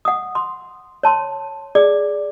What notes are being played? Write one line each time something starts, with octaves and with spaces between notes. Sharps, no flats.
F#5 D#6
C6
C#5 A5 C6
G#4 D5 D6